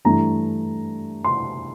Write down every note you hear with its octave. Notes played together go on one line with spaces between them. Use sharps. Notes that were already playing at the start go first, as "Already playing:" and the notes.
G2 E3 A3 D4 A#5
C6